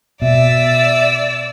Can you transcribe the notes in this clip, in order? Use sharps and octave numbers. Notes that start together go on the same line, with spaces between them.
B2 D5 E5 E6